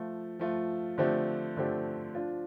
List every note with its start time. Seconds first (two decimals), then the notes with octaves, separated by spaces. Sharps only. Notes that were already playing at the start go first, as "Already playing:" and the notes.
Already playing: F3 A3 F4
0.39 F3 A3 F4
0.98 D3 F3 A3 C4 G4
1.57 D3 F3 A3 C4 G4
2.15 F3 D4 F4